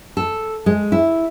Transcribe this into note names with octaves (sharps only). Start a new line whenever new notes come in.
A4
G#3
E4